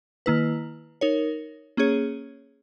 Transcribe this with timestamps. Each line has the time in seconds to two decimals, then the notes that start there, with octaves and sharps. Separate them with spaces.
0.26 D#3 A#3 E4 B4
1.01 D#4 A#4 C#5
1.77 A#3 C#4 G#4 C#5